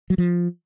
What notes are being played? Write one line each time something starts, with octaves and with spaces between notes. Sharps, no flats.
F#3
F3